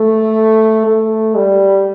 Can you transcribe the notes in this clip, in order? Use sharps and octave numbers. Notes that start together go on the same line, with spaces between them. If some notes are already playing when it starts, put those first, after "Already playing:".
Already playing: A3
A3
G3